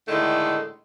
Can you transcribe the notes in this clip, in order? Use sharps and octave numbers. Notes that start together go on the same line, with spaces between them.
A2 D3 D#3 G#3 A3